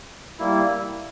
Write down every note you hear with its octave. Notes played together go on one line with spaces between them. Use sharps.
G3 A#3 E4